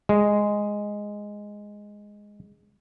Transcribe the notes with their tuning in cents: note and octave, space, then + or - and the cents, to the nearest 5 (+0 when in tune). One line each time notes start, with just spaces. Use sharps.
G#3 -5